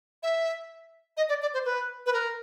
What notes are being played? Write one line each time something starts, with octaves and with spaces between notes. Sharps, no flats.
E5
D#5
D5
D5
C5
B4
B4
A#4